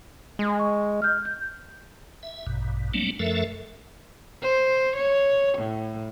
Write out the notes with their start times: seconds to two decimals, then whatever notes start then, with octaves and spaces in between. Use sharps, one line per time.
0.39 G#3
0.59 C#6
1.02 F6 G6
1.25 G6
2.23 E5
2.47 A#1 G2 B2
2.94 F#3 G3 A3 A#3 C4 D4
3.19 F#2 F3 A3 A4 A#4 E5
4.42 C5
4.97 C#5
5.58 A2